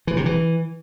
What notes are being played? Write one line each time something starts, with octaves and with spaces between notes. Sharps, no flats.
E3
C3
E3